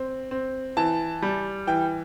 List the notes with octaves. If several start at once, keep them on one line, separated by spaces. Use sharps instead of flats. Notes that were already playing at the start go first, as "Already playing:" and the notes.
Already playing: C4
C4
E3 A5
G3
E3 G5